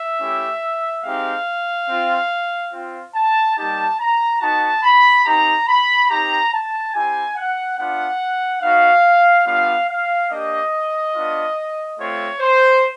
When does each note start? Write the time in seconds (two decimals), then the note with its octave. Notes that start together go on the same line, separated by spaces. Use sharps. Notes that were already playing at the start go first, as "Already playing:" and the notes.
Already playing: E5
0.21 A3 C#4 E4 G4
1.05 G#3 C4 D#4 G4 F5
1.89 C4 F4
2.73 C4 F4
3.15 A5
3.57 G3 A#3 D#4 G4 A5
3.99 A#5
4.40 B3 D#4 F#4 A5
4.83 B5
5.25 C4 D#4 G4 A#5
5.67 B5
6.09 C4 D#4 G4 A#5
6.52 A5
6.93 C4 E4 G4 G#5
7.36 F#5
7.77 B3 D4 F4 F#5
8.62 B3 D#4 F#4 F5
9.45 G3 B3 D4 F4 F5
9.88 F5
10.30 A#3 D4 G4 D#5
11.14 B3 D4 F4
11.98 A3 C4 F4 C#5
12.41 C5